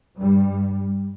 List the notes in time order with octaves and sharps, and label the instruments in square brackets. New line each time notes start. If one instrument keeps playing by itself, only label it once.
[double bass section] G2 G3